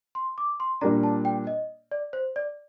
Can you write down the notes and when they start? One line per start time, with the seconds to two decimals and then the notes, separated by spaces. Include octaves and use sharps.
0.15 C6
0.38 D6
0.60 C6
0.81 A#2 G3 A#3 D4 A#5
1.03 A5
1.25 G5
1.47 D#5
1.91 D5
2.13 C5
2.36 D5